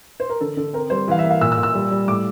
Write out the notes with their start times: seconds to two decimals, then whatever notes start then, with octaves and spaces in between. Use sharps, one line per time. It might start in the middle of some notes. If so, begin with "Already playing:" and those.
0.20 C5
0.29 A#4
0.41 D3 A4
0.57 D3 A4
0.73 C4 A#4
0.90 G3 C5
1.08 E3 F5
1.19 E5
1.23 A#3
1.30 F5
1.41 A#2 E6
1.52 E6
1.57 A#2
1.63 E6
1.75 G3
1.91 G3
2.07 A2 D6